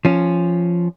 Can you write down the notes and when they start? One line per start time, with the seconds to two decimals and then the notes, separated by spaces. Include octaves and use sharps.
0.05 F3 C#4